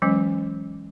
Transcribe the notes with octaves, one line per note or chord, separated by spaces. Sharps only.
E3 F#3 G#3 C#4